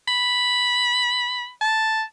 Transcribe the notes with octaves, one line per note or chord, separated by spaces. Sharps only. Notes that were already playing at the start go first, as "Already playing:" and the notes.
B5
A5